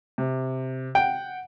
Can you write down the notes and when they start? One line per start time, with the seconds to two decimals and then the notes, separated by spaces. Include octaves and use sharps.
0.18 C3
0.95 F#5 G5